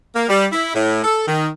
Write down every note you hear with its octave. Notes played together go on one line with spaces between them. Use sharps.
A#3
G3
E4
A2
A4
D#3